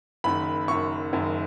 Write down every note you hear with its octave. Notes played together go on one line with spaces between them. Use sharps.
F#1 F#2 D#3 B5
F#1 F#2 D#3 C#6
F#1 F#2 D#3